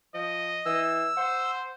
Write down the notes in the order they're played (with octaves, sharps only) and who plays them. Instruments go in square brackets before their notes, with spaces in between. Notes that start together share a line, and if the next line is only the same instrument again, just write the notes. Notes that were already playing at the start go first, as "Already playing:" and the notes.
[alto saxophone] F3 [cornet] D#5
[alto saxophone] E3 [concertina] E6
[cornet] C5 [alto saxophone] F#5